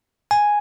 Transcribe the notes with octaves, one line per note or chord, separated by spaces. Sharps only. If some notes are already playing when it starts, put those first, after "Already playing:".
G#5